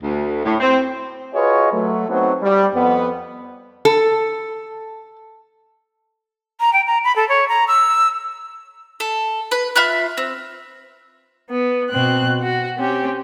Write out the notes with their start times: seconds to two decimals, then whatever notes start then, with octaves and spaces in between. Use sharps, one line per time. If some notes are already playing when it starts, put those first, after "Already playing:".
0.03 D2
0.44 A2
0.61 C4
1.34 F4 F#4 G#4 B4 C#5 D#5
1.73 F#3 A3
2.09 F#3 A3 B3 C4 D#4 C5
2.41 G3
2.74 F2 B3
3.85 A4
6.60 A#5
6.73 G5
6.87 A#5
7.04 B5
7.16 A4
7.29 C#5
7.49 A#5
7.68 E6
9.00 A4
9.51 B4
9.76 F4 E5 B5 F#6
10.17 C4
11.49 B3
11.89 B2 C4 F#6
12.43 F#4
12.77 C4 C#4 G4